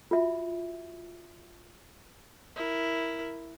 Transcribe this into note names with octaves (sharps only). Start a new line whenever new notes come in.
F4 F#4 E5
E4 A#4